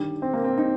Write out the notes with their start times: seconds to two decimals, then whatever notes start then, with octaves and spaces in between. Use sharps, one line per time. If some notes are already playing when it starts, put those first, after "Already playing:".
Already playing: G1 G2 D#3 G4
0.22 C4
0.34 A#3
0.44 C4
0.58 D#4